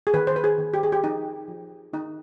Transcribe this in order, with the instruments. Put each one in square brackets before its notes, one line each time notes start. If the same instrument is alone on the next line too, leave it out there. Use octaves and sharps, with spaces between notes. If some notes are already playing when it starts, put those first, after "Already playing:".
[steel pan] G#4
D#3 B4
C5
B4
G#4
D#3
G4
G#4
G4
F3 D#4
F3
D#3 D#4